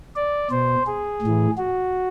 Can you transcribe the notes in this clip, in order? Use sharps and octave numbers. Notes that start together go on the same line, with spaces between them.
D5
B2 C5
G#4
A2 E3
F#4